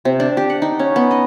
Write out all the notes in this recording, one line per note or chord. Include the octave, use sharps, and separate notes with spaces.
C3
D4
G4
F#5
D#4
C#4
B3
D#5